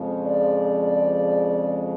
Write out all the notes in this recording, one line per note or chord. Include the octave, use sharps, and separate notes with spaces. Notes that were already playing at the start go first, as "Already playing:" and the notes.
Already playing: F2 C#3 F3 G#3
D5